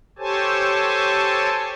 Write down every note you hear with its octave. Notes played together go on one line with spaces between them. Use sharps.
G4 A4 C5 C#5 G#5 A5